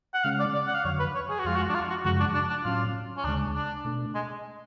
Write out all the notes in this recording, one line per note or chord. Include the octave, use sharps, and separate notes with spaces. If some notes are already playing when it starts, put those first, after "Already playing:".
F#5
C#3 G#3 C#4 F5
D5
D5
F#5
F5
F2 D3 F#3 C#5
B4
C#5
G#4
F#4
F2 F3 G#3 F4
F#4
D4
F4
F#4
F#2 C#3 F3 G#3 F#4
D4
D4
D4
A2 F#3 C#4 F4
C#4
D2 C#3 G#3 D4
D4
B2 A3 D4
G#3